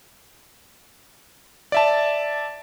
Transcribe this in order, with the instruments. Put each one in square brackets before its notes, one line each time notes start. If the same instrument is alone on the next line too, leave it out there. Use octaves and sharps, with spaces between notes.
[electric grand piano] D5 E5 A5